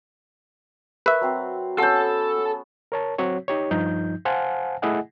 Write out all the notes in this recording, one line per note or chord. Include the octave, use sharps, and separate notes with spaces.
A#4 B4 E5 C#6
F#3 C4 C5
B3 C#4 A4 C5 C#5 F#5 A5
A#4 C#5 A5
F#3 C4 F#4 C#5
D#4 G4 C#5
G2 F3 D#4 G6
C5 F5 F#5 G#5 A5
A3 E4 G#4 D#5 F#5 G#5